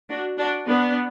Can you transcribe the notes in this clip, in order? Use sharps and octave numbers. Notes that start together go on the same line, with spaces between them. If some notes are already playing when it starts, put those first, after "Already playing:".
D4 F#4
D4 F#4
B3 D4